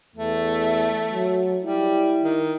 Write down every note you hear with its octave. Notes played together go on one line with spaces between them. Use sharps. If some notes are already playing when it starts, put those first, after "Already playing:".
E2 A3
F#3
G3 E4
D#3